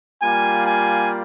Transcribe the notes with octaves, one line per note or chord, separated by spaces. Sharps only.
G3 A#3 F4 G#5
G#5